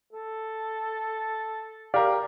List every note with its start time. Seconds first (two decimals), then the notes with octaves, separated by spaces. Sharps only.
0.13 A4
1.94 G4 A#4 D5 F5